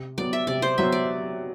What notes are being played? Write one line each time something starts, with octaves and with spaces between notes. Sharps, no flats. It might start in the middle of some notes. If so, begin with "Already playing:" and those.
Already playing: C3
F#3 B3 D5
E5
C3 D5
C5
F#3 B3 E5
D5